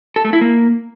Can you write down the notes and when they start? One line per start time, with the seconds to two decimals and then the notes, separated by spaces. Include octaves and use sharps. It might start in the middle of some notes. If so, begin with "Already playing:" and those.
0.16 A4
0.25 A3
0.33 E4
0.41 A#3